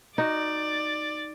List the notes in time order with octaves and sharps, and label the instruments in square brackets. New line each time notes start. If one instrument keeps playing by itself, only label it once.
[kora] D#4 F#4 [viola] D5